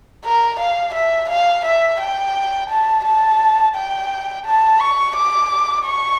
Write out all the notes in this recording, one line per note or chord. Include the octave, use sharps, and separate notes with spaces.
A#4
F5
E5
F5
E5
G5
A5
A5
G5
A5
C#6
D6
C#6